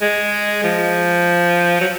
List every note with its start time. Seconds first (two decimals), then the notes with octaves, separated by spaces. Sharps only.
0.01 G#3
0.64 F3
1.81 F#3